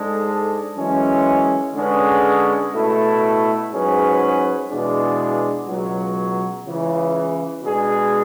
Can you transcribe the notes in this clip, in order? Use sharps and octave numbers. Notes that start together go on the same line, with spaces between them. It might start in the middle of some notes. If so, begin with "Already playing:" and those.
Already playing: G#2 G#3 D4 A4
F#2 E3 G#3 C#4
D3 G#3 C#4 G#4 B4
B2 A3 E4 A4
G#2 F#3 C#4 G#4 B4
E2 B2 G#3 D4 G#4
C#2 B2 F#3
C#2 C#3 E3
B2 G#3 D4 G#4